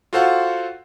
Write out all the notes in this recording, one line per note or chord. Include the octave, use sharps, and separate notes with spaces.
F4 F#4 A4 C5 F5 F#5